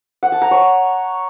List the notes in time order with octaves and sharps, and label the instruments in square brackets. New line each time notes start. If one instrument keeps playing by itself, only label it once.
[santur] F#5
A5
A#5
C#5